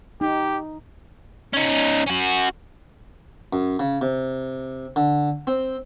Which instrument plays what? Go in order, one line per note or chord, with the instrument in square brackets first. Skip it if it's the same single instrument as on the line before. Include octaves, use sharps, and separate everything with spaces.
[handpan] D#4 [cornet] G4
[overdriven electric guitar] C#4 D#4
C#4 F#4
[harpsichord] F#2
C#3
C3
D3
C4